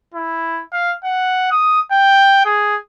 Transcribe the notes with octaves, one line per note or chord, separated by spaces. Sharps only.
E4
F5
F#5
D#6
G5
G#4